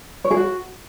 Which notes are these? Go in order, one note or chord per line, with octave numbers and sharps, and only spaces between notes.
C#5
G#4
F#4